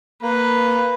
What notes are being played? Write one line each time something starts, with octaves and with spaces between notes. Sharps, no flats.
A#3 B4